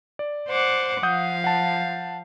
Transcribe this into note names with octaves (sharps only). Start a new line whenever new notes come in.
D5
C5 F#5 D6
F3 F5 F#5 D#6 G6
F#5 A5